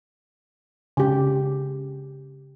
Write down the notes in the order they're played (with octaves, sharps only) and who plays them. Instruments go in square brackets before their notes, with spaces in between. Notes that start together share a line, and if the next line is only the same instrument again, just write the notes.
[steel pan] C#3 G4